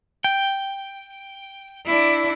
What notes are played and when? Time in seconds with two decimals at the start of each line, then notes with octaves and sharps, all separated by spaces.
0.24 G5
1.86 D4 E4